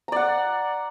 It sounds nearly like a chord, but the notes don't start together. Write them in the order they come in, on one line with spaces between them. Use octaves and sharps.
A#5 D5 F#5